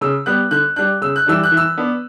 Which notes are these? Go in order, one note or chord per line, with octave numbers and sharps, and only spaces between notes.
C#3 E6
G3 B3 F#6
D3 F#6
G3 D4 F#6
C#3 E6
F#6
E3 G3 D4 E6
F#6
E3
E6
B3 D4